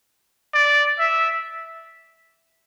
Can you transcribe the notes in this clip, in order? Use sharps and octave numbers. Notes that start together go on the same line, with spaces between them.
D5
E5